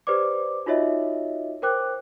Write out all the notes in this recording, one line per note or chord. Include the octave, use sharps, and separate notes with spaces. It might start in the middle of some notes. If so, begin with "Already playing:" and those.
G4 B4 C5 D5 D6
D#4 F4 F#4 C#5 D#5 E5
A#4 C5 G5 D6 F#6